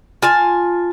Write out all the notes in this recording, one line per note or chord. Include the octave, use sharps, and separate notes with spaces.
F4 G#5 A5